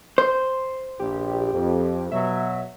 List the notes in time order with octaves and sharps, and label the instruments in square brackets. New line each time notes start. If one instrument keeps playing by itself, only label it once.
[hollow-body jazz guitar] C5
[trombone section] A#1 [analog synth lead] G4
[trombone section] F2
[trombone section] B2 F#3 [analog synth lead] E5